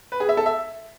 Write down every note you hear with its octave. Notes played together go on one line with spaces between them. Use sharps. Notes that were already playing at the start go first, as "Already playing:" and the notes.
B4
G#4
E5
A4
E5